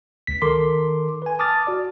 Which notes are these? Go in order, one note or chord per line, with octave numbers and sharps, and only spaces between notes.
C#2 B6
D#3 A4 A#4 C6 D6
B4 G#5
A5 D6 D#6 F6 A6
F#4 D5